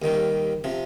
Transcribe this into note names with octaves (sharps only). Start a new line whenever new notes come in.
D#2 D#3 G3
C3 F3